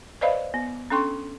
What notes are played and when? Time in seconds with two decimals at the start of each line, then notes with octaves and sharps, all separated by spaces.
0.21 B4 C5 D5 D#5 F5 B5
0.54 B3
0.90 C#4 D4 A4 G5 C6 C#6